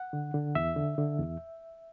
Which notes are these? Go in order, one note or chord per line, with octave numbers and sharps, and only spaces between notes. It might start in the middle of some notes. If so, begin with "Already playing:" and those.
Already playing: F#5
D3
D3
E2 E5
D3
D3
E2